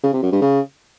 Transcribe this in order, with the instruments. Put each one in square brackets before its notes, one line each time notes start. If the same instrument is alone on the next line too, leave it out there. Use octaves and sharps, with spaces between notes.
[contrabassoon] C#3
C3
F#2
G2
C#3